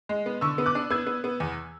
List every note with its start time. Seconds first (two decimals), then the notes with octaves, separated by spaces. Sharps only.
0.09 G#3
0.26 B3
0.41 D3 C#6 E6
0.58 B3
0.66 D6 F#6
0.75 D4
0.90 B3 E6 G#6
1.07 B3
1.24 B3
1.40 E2